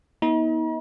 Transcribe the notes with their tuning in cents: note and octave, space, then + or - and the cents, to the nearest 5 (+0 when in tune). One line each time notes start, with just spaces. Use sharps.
B3 -40 D#4 +40 A#5 +45